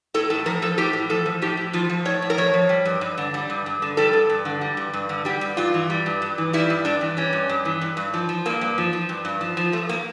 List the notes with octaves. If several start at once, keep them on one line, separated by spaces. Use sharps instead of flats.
A2 A4
A2 A4
F3 A#4
F3 A4
A2 G4
A2
F3 A4
F3
A2 G4
A2
F3 F4
F3
A2 C#5
A2
A#4
F3 C#5
F3
G3
G2
G2
D3
G3
G2
G2
D3
G3 A4
G2
G2
D3
G3
G2
G2
D3
G3 G4
G2
G2 F4
E3
G3
G2
G2
E3
G3 E4
G2
G2 D4
E3
G3 C#4
G2
G2
E3
G2
G2
F3
F3
G2 A#3
G2
F3
F3
G2
G2
F3
F3
G2 A3
A#3